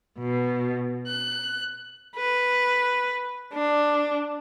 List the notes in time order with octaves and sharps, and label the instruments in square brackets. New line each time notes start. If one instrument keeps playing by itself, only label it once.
[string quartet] B2
F#6
[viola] B4
D4